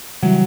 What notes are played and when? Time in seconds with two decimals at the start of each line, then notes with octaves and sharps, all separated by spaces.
0.22 C#3 E3 F#3 G3